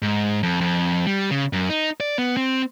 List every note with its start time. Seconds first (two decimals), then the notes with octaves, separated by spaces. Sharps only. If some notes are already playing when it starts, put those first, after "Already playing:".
0.02 G#2
0.43 F2
0.61 F2
1.07 G3
1.31 C#3
1.53 F#2
1.69 D#4
2.00 D5
2.18 B3
2.37 C4